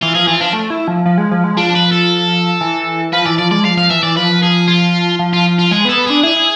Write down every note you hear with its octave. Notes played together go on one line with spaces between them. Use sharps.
E3 F4
F3 G#4
E3 F4
F3 D4
A3
E4
F3
F3
G#3
F3
G#3
F3 D4
B4
A4
E3
F3 B4
E3 D5
F3 D5
G#3 D5
F3 F5
F3 F5
E3 E5
E3 D5
F3 B4
G#4
F4
F3
F4
F4
G#3 G#4
B3
A4
B3
D4 G#4
E4 G#4
E4